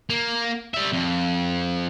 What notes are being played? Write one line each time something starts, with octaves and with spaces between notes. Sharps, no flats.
A#3
G3 E5
F2